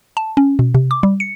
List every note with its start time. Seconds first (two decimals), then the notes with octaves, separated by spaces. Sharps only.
0.17 A5
0.37 C#4
0.59 B2
0.75 C3
0.91 D6
1.03 G3
1.20 C#7